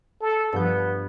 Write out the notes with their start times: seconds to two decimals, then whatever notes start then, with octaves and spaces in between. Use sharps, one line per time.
0.21 A4
0.53 G2 F3 B3 G6